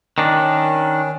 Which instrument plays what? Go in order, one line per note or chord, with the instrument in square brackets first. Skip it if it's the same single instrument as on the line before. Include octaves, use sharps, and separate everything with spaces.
[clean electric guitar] D#3 D4 [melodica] C#4